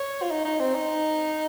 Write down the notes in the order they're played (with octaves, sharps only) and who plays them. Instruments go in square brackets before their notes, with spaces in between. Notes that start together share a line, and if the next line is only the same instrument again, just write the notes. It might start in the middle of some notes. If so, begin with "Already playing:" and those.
Already playing: [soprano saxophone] C#5
F4
D#4
D#4
C4
D#4